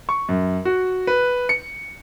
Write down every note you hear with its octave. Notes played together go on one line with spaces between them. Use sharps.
C#6
F#2
F#4
B4
C#7